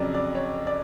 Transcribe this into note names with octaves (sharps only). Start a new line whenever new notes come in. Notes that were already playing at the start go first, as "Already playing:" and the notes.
Already playing: F2 C#3 F#3 D5
D5
C#5
D5